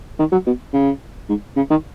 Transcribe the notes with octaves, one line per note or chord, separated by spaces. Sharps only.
D#3
F#3
B2
C#3
G#2
C#3
D#3